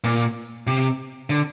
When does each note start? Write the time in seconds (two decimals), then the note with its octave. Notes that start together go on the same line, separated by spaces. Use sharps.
0.04 A#2
0.67 C3
1.30 D3